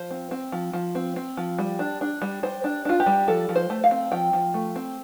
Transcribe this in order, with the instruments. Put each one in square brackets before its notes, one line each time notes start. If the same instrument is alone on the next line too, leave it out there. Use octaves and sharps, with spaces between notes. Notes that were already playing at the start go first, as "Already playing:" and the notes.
Already playing: [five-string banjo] F3 C5
C4
C4
F3
F3
C4
C4
F3
G3
D4
D4
G3
G3 C5
D4
D4 F4
G4
G3
F3 A4
F3
C5
A3
F5
C4
F3 G5
F3
A3
C4